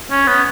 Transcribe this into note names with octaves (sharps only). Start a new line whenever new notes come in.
C#4
B3